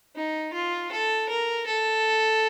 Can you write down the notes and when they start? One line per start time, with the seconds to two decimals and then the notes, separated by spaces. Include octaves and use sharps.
0.16 D#4
0.53 F4
0.91 A4
1.29 A#4
1.67 A4